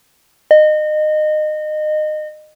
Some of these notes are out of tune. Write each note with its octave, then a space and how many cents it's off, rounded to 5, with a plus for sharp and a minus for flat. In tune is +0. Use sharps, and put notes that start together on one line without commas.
D#5 -25